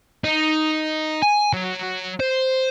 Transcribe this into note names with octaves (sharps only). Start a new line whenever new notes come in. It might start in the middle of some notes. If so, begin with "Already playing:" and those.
D#4
G#5
F#3
C5